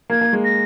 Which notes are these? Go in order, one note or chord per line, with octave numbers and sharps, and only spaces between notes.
A#3 G#6
A#3
G#3
A#6